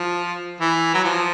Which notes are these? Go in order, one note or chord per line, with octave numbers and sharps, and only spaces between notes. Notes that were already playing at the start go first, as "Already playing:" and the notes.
Already playing: F3
E3
F#3
F3